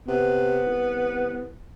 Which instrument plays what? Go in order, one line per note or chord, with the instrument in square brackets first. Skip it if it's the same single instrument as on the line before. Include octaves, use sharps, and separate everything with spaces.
[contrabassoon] C3 [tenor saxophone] B3
[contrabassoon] C2